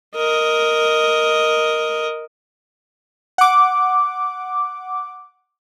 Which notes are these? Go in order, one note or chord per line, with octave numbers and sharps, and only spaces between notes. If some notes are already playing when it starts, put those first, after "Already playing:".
A#4 D#5
F#5 D6